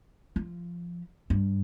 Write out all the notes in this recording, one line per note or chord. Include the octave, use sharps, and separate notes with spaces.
F3
G2